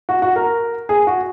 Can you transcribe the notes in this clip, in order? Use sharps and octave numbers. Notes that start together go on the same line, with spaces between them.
F#4
F#4
A#4
G#4
F#4